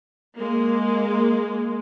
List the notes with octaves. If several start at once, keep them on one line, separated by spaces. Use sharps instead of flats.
G#3 A#3